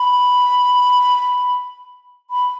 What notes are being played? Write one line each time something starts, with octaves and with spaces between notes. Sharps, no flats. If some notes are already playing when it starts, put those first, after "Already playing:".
Already playing: B5
B5